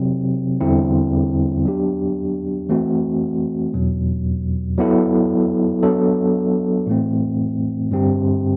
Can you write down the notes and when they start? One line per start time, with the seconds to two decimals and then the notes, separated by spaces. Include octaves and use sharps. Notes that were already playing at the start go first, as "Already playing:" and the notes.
Already playing: C3 F#3 C4
0.60 E2 D3 G3 C4 E4
1.65 F#3 B3 D4 G4
2.69 E3 A3 C4 F#4
3.74 E2 B2 F#3
4.78 F#3 B3 E4 A4
5.83 F#3 B3 D4 A4
6.87 A2 E3 A3 C4
7.91 G2 D3 G3 C4 G4